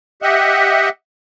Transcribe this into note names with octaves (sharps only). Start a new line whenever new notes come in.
G4 D#5 E5 F#5